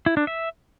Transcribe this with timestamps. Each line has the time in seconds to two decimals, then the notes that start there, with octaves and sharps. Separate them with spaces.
0.06 E4
0.17 D4
0.27 E5